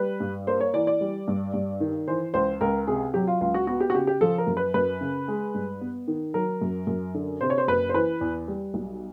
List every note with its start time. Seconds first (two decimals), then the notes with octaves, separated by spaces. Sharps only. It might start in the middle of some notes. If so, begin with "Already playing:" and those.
Already playing: G3 B4
0.20 G2
0.47 A#3 C5
0.61 C#5
0.74 E3 D5
0.87 D5
1.01 G3
1.28 G2
1.54 G2
1.80 D#3
2.08 E3 C5
2.34 C#2 C5
2.61 C#2 A#4
2.87 C3 G#4
3.14 F#3 G4
3.27 F4
3.41 C#2 F4
3.54 F#4
3.67 B3 F#4
3.80 G4
3.90 F#4
3.95 C#3 G4
4.07 G4
4.21 F3 A4
4.38 A#4
4.47 F#2
4.57 B4
4.74 F#2 B4
5.01 C#3
5.28 G#3
5.55 G2
5.81 B3
6.08 D#3
6.34 F#3 A#4
6.61 F#2
6.87 F#2
7.15 D3
7.41 C3 C5
7.50 C#5
7.58 C5
7.68 F#1 B4
7.89 C5
7.94 E3 B4
8.21 E2
8.48 G3
8.74 B1